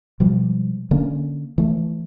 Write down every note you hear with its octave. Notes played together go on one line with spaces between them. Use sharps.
B2 F3 G3 G#3
D3 A#3 C#4
E3 A3